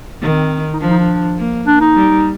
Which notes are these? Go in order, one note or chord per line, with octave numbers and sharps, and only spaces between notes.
D#3 C4
D#4
F3 D4
D#4
D4
A#3
D4
D#4
G3